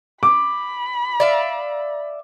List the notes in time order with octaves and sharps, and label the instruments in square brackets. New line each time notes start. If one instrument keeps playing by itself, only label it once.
[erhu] B5 [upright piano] D6
[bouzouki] D5 E5 F5